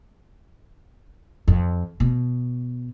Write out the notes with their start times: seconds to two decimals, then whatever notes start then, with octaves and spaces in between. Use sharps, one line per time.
1.48 F2
2.00 B2